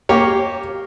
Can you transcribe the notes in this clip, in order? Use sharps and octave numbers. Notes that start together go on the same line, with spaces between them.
A#3 G4 C#5